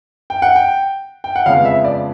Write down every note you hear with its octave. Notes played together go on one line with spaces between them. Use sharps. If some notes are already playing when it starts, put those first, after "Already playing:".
G5
F#5
G5
G5
F#5
F2 C#3 F3 G#3 B3 F5
E5
D5